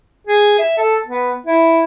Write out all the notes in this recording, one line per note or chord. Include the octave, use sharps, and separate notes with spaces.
G#4
E5
A4
B3
E4